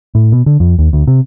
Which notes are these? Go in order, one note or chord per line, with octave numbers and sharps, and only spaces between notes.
A2
B2
D3
F2
D#2
D2
C3